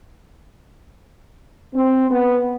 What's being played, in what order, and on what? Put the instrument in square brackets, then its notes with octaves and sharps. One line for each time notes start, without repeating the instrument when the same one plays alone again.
[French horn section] C4
B3